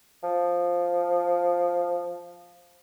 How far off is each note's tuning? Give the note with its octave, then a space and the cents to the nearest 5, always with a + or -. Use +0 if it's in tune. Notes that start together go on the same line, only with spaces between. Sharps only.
F3 +5